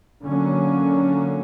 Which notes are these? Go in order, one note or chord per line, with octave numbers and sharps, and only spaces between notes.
D3 F#3 A#3 C#4